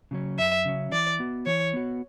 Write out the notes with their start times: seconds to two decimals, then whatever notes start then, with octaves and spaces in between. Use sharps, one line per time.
0.11 C#3 F#3 C#4
0.38 F#2 E5
0.65 C#3 F#3 C#4
0.92 E3 D5
1.19 B3 F#4
1.46 E3 C#5
1.73 B3 F#4